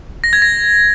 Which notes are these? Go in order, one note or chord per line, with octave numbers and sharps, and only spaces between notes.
A#6
G#6
A#6